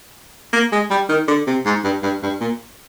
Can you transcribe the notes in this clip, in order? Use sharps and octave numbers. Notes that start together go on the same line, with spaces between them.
A#3
G#3
G3
D#3
D3
C3
G#2
G2
G2
G2
A#2